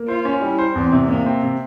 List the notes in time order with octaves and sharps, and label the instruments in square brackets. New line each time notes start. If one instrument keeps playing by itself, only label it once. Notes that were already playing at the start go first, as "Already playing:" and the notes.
Already playing: [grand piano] A#3
[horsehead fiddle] F4 [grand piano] C5
[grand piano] C#4
[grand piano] G3 [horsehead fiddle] E4
[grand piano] C5
[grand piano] E2 [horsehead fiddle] C4
[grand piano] C3
[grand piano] C3 [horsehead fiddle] A#3
[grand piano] C4
C3